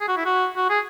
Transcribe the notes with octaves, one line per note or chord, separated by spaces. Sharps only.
G#4
F#4
E4
F#4
F#4
G#4